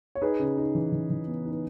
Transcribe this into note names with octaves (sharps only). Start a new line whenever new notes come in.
C#5
D#4 G#4 B4
C#3
D#4
E3
E3
E3
B3
D#4
B4